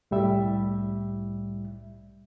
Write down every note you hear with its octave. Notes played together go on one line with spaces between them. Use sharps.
C2 A2 G3 E5